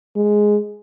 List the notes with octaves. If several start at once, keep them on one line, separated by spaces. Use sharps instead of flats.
G#3